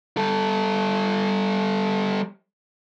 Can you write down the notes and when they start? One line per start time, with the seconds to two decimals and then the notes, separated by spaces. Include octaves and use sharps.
0.17 G3 A4